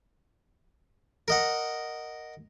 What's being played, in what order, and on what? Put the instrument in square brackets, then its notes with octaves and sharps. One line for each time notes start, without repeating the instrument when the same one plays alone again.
[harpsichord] A#4 D#5 F#5